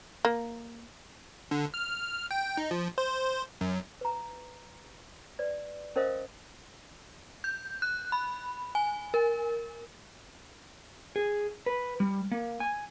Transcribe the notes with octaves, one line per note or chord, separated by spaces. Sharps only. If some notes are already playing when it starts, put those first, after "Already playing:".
A#3
D3
F6
G5
D#4
F3
C5
F#2
B4 A#5
B4 D5
C#4 A#4 C5 D#5 F5 D#6
G6
F#6
B5
G#5
A#4
G#4
B4
G3
A#3
G#5